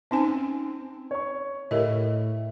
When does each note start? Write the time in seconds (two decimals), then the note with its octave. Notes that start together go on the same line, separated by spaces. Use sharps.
0.11 C4 C#4 D#4 G#5
1.11 C#5 C#6
1.71 A2 G4 A#4 D#5